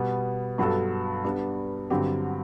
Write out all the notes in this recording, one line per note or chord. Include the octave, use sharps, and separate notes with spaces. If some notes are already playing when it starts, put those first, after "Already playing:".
Already playing: B2 G3 B3
G2 F#3 B3 F#4 A4
G3 B3 D4
G2 D3 F#3 C4 G4